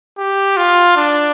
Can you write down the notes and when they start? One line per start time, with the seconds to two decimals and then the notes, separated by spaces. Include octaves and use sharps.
0.18 G4
0.57 F4
0.97 D4